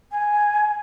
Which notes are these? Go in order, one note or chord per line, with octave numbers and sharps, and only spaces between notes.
G#5